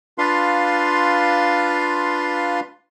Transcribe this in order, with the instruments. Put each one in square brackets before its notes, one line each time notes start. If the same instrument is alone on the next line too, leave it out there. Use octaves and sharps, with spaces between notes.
[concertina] D4 F4 B4 F5 C6